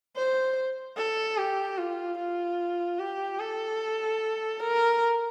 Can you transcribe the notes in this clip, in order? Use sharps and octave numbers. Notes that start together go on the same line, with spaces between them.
C5
A4
G4
F4
F4
G4
A4
A#4